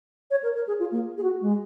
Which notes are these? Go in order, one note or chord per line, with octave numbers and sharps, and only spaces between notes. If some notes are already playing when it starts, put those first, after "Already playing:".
C#5
A#4
A#4
G#4
F4
A#3
G#4
F#4
G#3